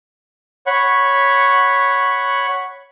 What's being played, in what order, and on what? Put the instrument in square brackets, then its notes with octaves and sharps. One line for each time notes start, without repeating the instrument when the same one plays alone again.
[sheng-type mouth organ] C#5 F#5 B5 C#6